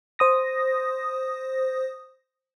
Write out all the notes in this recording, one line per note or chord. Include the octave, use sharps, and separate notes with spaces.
C5 D#6 A#6